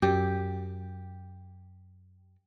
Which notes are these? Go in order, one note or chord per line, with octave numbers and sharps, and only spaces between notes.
F#2 G4